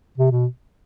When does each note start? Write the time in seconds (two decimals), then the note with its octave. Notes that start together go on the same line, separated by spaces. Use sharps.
0.18 C3
0.32 B2